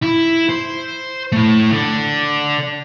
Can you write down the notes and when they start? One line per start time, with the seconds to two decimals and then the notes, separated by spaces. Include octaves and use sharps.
0.02 E4
0.49 C5
1.32 A3 E4
1.72 D3